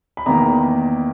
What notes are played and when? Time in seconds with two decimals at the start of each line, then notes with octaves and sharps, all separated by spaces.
0.17 B5
0.26 E2 D#3 A#3 A#5